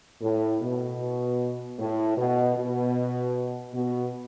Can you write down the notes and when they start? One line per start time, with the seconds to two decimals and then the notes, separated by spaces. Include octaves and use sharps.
0.21 A2
0.61 B2
1.79 A2
2.17 B2
2.56 B2
3.74 B2